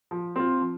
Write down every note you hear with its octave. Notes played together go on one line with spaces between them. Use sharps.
F3
C4 F4
F3